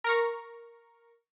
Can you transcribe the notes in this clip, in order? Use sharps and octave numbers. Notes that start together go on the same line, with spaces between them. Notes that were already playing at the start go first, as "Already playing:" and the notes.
A#4 A#5 C#6